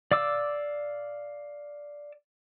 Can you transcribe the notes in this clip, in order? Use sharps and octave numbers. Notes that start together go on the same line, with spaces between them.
D5 F5 D6 E6